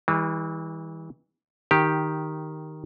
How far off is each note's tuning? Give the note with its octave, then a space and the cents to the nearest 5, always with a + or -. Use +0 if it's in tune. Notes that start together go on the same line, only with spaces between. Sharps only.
E3 -30 G3 +35
D#3 +0 G4 +0